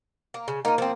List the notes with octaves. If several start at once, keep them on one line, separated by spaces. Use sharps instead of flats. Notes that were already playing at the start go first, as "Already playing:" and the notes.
A#3
C#3
A#3 D#4 F4
F3 C4